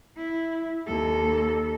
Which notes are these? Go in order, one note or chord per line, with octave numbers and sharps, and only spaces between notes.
E4
D#2 A4